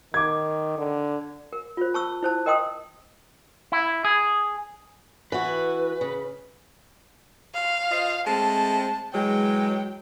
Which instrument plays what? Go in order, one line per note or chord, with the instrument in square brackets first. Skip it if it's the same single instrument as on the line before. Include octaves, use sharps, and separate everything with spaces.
[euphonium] D#3 [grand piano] D6 G#6
[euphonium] D3
[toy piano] A#4
F4 C5
A5 C#6 E6
E4 C5 A5
A#4 D#5 G5 C6 D#6
[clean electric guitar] E4
G#4
[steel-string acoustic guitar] E3 F#4 [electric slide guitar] B4
[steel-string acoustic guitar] C#3
[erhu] F5
[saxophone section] F4 C5 D#5
[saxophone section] G#3 A3 C4 [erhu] A5
[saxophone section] E3 F#3 G#3 [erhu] G5